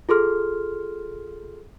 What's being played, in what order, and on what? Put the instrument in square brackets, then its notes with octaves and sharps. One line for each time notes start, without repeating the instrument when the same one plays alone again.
[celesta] F4 G#4 A4 C6 F6